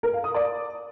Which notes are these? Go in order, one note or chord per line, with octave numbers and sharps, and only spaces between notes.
A#4
F5
D#6
D5